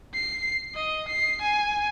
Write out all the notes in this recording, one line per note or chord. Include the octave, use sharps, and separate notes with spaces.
C7
D#5
C7
G#5